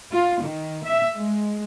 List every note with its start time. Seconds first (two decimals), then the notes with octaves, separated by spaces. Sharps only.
0.12 F4
0.41 D#3
0.84 E5
1.15 G#3